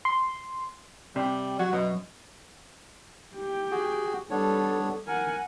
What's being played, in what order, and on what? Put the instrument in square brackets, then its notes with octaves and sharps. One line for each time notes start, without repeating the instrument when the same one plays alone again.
[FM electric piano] C6
[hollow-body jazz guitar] C3 [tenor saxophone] G3
[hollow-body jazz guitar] F#3 [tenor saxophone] F#4
[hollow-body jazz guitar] F#2 [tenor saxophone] B2
[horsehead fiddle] G4 G5
[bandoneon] F#4 G#4
[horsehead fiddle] G3 A4 [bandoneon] B3 D4 C#5
[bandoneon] A#4 [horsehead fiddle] F#5 G#5